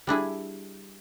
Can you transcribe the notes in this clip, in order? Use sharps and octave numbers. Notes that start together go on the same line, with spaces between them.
G3 D4 E4 G#4